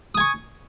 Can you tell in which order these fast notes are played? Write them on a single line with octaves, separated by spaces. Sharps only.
D#6 G#5 C#6